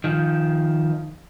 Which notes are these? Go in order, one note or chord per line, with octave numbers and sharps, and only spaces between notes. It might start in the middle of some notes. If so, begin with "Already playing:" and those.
D#3 F3